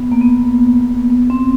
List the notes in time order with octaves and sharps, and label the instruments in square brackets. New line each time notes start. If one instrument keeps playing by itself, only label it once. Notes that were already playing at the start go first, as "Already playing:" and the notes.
Already playing: [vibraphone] B3
A#3
B3
B3
C4